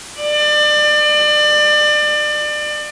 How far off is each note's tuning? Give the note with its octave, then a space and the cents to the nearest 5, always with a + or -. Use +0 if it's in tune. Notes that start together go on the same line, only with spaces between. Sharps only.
D5 +30